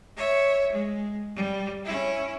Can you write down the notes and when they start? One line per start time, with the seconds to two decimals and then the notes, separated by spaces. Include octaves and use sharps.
0.17 C#5 E5
0.72 G#3
1.35 G3
1.85 C#4 E4